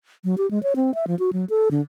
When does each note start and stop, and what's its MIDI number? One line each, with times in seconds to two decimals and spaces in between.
0.24 0.35 54
0.38 0.49 67
0.51 0.61 56
0.63 0.73 73
0.76 0.94 60
0.94 1.05 76
1.07 1.17 53
1.19 1.30 66
1.33 1.45 54
1.50 1.69 69
1.71 1.81 50